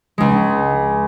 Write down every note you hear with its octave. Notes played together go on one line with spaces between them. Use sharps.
C#2 G#3